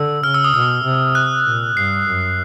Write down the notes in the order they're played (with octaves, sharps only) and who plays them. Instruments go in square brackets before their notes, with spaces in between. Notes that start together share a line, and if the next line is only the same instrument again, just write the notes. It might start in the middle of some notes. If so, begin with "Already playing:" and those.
Already playing: [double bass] D3 [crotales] E6
[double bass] C#3 [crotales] F6
[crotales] E6
D#6
[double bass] B2 [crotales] E6
[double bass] C3
[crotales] F#6
[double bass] A#2
[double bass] G2 [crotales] C7
[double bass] F#2